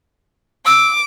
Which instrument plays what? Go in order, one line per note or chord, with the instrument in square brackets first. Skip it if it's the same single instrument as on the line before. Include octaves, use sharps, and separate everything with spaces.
[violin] D6 [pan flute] E6